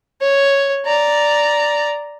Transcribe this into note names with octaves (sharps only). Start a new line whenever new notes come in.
C#5
D5 A#5